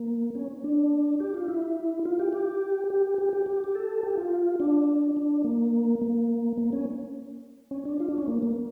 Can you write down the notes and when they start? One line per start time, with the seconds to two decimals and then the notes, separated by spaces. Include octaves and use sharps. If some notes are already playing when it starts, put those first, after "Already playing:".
Already playing: A#3
0.35 C#4
0.64 D4
1.20 G4
1.34 F4
1.48 E4
2.05 F4
2.19 G4
2.33 G4
2.90 G4
3.18 G4
3.33 G4
3.46 G4
3.64 G4
3.75 A4
4.03 G4
4.17 F4
4.60 D4
5.17 D4
5.44 A#3
6.02 A#3
6.57 A#3
6.73 C#4
7.71 C#4
7.85 D4
8.00 F4
8.08 D4
8.18 C#4
8.28 A#3
8.43 A#3